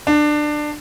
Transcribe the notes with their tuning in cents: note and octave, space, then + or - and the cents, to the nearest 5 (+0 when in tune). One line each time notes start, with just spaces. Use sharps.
D4 +20